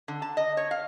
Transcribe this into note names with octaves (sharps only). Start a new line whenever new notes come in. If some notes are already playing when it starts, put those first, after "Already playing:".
D3
A5
D#5
C#5
F5